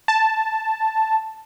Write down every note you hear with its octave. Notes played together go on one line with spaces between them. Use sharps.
A5